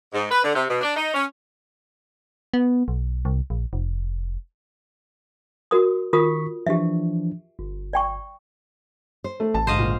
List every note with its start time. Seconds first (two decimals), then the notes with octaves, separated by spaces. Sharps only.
0.13 G#2
0.31 B4
0.44 D3
0.55 C3
0.68 B2
0.81 D4
0.96 D#4
1.14 C#4
2.54 B3
2.88 B1
3.25 C2
3.50 A#1
3.73 F1
5.71 F#4 A#4 D#6
6.13 D#3 F4 A#4 C#6 D#6 B6
6.67 E3 F3 D4 G4 E5
7.59 G1
7.93 D5 G5 C#6
9.24 C5
9.40 A3
9.54 A1 A5
9.67 D2 G#2 C5 D#5 F5
9.78 A#2